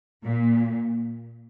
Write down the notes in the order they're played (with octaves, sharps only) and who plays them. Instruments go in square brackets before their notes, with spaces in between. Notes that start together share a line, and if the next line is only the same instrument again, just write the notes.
[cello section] A#2